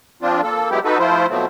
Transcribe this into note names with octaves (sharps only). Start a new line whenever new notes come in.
F3 C4 D4 F4
A#3 A4
F#3 G#3 B3 E4 G4
D#4 F#4 A4 B4
F3 A3 E4 F4 C5
B2 F3 F#3 A3 C4